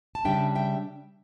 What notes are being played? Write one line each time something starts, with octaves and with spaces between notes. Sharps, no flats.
A5
C#3 G3 D4 E5 G5
E5 G5